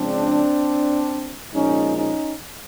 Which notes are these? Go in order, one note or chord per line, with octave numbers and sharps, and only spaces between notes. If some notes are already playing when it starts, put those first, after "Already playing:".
Already playing: C#3 F3 G#3 C4 D4
A#2 F3 G#3 C#4 D#4
C#4 D#4